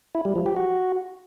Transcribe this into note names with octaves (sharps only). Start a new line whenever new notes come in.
E4
G3
F3
G4
F#4